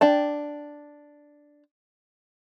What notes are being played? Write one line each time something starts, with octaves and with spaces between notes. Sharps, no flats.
D4 G5 A5